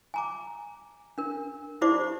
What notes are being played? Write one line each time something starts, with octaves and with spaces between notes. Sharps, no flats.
G#5 A#5 D6
D4 A#4
D#4 E4 G4 C5 D5 D6